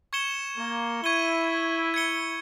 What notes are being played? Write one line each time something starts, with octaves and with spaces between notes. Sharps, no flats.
C#6 G#6 C#7 E7 G7
A#3
E4 C#6 G#6 D#7 G7
G#6 C#7 G7